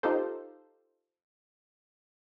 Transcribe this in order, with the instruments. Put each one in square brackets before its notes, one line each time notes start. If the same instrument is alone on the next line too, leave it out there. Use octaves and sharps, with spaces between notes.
[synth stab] D#4 F4 G4 A4 C5